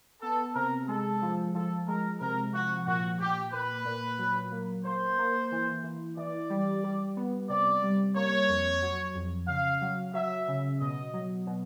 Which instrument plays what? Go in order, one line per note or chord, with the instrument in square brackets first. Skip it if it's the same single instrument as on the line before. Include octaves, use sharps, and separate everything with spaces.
[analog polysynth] B3 [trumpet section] A4
[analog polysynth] C3 [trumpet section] A#4
[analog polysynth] G#3 [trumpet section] A4
[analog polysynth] F3
[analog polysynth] F3 [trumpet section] A4
[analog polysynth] G#3 [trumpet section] A#4
[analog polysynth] C3 [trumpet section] A#4
[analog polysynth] F3 [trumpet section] F#4
[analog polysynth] A#2 [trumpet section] F#4
[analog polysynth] A#2 [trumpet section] G4
[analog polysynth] A#2 [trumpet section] B4
[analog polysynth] A#2
F#3
A#3
[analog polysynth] A#3 [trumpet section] C5
[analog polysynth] A#3
E3
E3
[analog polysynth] E3 [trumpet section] D5
[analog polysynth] G3
G3
B3
[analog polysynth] C3 [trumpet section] D5
[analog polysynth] G3
[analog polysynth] A#3 [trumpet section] C#5
[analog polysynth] F2
F#3
F2
[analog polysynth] C#3 [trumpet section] F5
[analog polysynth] F#3
[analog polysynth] F#3 [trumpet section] E5
[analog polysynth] C#3
[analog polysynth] B2 [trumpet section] D#5
[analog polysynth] F#3
B2